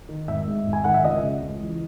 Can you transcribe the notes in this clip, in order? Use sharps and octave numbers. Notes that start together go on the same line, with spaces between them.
D#3
G#1 E5
G#2
G#1
G#5
D#3 F#5
E5
C#2 D#5
C#3
C#2
E3